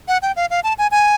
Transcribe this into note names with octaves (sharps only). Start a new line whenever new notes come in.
F#5
G5
F5
F5
A5
G#5
G#5